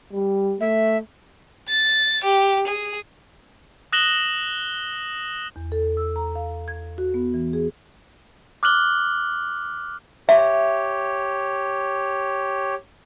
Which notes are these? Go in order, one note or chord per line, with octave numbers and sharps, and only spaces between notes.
G3
A3 E5
A6
G4
G#4
D#6 F#6 A#6 E7 F#7 G7
E2
A4
E6
A#5
F5
G#6
F#4
B3
E3
G#4
D6 F6 F#6 F#7 G7
G4 C#5 E5